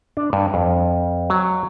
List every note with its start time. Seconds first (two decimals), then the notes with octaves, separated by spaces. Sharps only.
0.17 D4
0.33 G2
0.54 F2
1.30 F#3